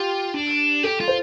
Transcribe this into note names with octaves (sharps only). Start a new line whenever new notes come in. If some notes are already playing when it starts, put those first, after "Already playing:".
Already playing: F4 G4
D4
G4 A4
F4
C5